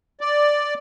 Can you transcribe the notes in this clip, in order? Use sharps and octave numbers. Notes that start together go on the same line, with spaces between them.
D5